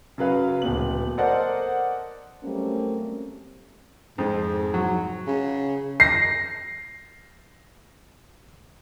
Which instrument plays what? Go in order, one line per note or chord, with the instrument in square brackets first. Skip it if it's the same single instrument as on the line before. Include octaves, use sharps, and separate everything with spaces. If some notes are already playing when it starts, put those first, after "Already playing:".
[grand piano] C#3 F#3 B4 F5
D1 A#2 B3 F#7
A4 A#4 C5 D5 D#5 F#5
[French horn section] F#3 G3 A3 A#3 C4 C#4
[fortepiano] F2 [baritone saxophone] G#2
[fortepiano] F#3
[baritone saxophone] C#3
[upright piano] A#6 C7